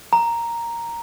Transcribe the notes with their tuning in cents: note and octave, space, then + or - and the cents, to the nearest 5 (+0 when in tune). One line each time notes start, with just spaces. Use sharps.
A#5 +0